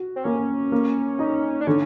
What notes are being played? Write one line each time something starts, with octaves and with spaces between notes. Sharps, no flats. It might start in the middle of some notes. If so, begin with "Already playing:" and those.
Already playing: F#4
C4
A#3 C#4
A#3
D#4
D4
D3 C#4